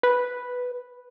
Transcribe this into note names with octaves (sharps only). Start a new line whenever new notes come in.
B4